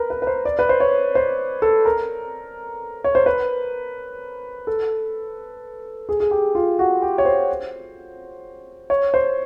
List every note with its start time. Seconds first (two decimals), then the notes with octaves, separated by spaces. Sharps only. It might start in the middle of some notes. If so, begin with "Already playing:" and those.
Already playing: A#4 B4
0.10 B4
0.22 B4
0.27 C5
0.45 D5
0.59 B4
0.69 C5
0.80 C#5
1.15 C5
1.62 A4
1.86 A#4
3.04 C#5
3.15 C5
3.26 B4
4.67 A4
6.09 G#4
6.20 G#4
6.31 G4
6.55 F4
6.79 F#4
7.02 G4
7.18 C#5
7.25 C5
8.90 C#5
9.14 C5